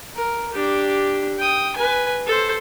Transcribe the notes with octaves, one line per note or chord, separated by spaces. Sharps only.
A#4
D4 G4
G5 D#6
B4 G#5
A4 C5